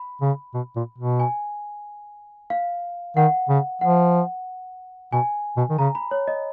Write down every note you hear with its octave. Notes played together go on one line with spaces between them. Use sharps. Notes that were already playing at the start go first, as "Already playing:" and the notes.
Already playing: B5
C#3
B2
A#2
B2
G#5
F5
D#3 F#5
C#3
F3 F#5
B2 G#5
B2
D#3
C#3 A#5
B5
C#5
D#5